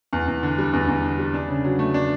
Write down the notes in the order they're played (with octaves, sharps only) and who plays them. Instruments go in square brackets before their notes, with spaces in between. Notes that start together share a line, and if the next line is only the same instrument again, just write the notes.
[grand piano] E2
E2
D3
G3
E2
E2
D3
G3
D4
C#3
F#3
A3
D4